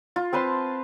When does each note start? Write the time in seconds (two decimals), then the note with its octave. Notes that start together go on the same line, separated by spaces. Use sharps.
0.16 F4
0.33 C4 B4 A5 C6